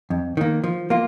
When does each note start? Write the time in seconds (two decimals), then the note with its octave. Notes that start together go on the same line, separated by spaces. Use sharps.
0.10 F2
0.37 D#3 A#3
0.64 F3
0.90 A#3 F4